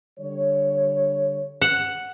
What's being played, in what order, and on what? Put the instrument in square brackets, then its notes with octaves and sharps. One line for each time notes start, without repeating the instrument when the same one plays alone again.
[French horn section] D3 G3 C#5
[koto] F#5